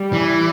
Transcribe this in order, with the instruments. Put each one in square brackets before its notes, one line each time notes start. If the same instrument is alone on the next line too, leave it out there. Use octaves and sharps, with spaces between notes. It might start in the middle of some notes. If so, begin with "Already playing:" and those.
Already playing: [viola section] G3
[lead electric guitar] E3